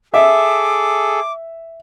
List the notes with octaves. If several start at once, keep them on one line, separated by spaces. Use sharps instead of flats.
G#4 A4 E5 D6